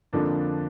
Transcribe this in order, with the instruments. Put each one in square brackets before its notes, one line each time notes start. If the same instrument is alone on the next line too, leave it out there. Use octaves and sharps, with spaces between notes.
[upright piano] F2 D3 F3 A#3 D4